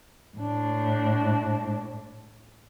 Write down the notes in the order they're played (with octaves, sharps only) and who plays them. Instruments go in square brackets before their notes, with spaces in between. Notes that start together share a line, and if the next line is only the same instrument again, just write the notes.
[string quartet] A2 D4